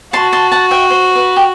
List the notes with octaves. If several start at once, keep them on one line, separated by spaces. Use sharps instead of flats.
F#4 A5 C6
A5 C6
F#5 A5
E5 G5
C5
B4
G4